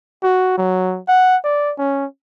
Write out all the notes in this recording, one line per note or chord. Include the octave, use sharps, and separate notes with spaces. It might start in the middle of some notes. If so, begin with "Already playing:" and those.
F#4
F#3
F#5
D5
C#4